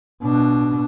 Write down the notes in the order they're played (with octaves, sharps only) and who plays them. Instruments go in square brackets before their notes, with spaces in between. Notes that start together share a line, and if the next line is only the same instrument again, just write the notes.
[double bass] B2 D4